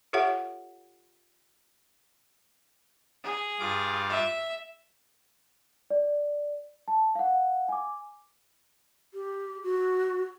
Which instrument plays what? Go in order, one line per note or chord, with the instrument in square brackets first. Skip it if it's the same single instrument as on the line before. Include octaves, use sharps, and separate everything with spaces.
[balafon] F4 G4 A4 C#5 E5 F#5
[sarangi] G#4
[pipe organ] G2 F4 D6
[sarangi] E5
[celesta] D5
A5
F5 F#5
G#5 D6
[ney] G4
F#4